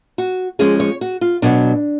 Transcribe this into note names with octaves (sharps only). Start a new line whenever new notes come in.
F#4
F3 G#3 C#4 G#4
C#5
F#4
F4
B2 F#3 B3 D4